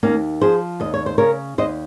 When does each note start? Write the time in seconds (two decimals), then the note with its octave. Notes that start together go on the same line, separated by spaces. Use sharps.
0.03 D#2 A#3 C#4
0.41 F3 G#4 C5
0.80 D#2 D#5
0.94 C#5
1.06 C5
1.18 C#3 A#4 C#5
1.58 D#2 C5 D#5